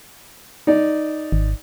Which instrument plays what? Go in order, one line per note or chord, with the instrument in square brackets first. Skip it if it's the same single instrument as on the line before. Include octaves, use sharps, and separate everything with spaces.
[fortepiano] D#4 D5
[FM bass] G#1